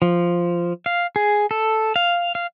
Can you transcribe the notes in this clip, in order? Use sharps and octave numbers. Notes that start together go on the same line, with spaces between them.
F3
F5
G#4
A4
F5
F5